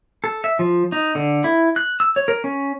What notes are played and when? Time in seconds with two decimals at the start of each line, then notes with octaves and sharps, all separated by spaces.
0.24 A4
0.44 E5
0.59 F3
0.92 D#4
1.15 D3
1.44 E4
1.76 F#6
2.00 E6
2.16 C#5
2.28 A#4
2.44 C#4